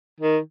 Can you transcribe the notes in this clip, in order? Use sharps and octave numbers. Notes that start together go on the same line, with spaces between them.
D#3